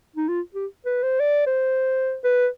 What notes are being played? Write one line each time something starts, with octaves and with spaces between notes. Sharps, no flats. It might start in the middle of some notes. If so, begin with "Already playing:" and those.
D#4
F4
G4
B4
C5
D5
C5
B4